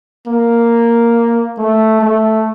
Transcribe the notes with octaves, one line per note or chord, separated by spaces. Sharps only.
A#3
A3
A3